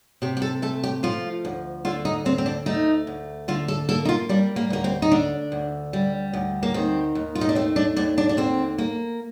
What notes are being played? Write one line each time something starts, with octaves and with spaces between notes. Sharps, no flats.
C3 G4
G4
A4
A3 A4
G4
F3 F4
D2
D3 F4
D#4
D2 C4
C4
D4
A3 D#4
D2
D3 F4
A4
A#3 A4
D#4
F4
G3 D4
A#3
D2 A#3
C4
D#4
D3 D4
D2
G3
D2
A#3
D#3 C4
D#2
F4
D#4
D4
A3 C4
D4
D#2 D4
D4
D4
D3 C4
A#3